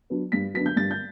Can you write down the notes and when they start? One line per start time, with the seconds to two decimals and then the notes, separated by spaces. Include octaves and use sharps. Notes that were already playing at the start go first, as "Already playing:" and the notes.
0.10 F#3 B3 D4
0.32 G2 B6
0.54 F#3 B3 D4 B6
0.66 G6
0.76 G2 A6
0.91 G6